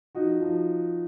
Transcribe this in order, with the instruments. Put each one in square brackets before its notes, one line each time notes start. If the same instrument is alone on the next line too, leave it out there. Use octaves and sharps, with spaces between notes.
[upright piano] F3 D#4 F#4
F3